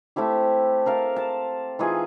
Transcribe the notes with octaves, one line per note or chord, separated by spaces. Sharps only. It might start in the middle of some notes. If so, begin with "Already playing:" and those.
A3 C4 E4 G4
A#4 F5 A5
A5
E3 D#4 F4 G#4